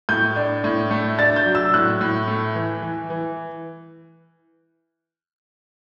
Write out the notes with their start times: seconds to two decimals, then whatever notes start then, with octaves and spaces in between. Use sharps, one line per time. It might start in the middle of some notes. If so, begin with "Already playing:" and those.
0.09 A2 G6
0.36 D4
0.64 A2
0.91 A3
1.18 D4 A6
1.36 G6
1.46 F#3
1.55 E6
1.74 A2 F#6
2.01 A2
2.28 A3
2.55 E3
2.82 E3
3.10 E3